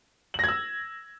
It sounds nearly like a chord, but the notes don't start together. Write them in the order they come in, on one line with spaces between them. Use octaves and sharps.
F#7 A#6 G#6 E6